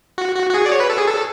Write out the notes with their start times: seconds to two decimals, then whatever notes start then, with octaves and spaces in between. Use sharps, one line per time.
0.18 F#4
0.36 F#4
0.50 F#4
0.54 G#4
0.66 D5
0.72 C#5
0.80 B4
0.90 A4
0.98 G#4
1.07 A4